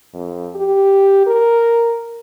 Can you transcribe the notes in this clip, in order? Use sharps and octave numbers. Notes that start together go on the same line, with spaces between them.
F2
G4
A#4